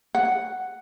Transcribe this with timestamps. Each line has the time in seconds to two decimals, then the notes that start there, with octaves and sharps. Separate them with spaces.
0.15 F#5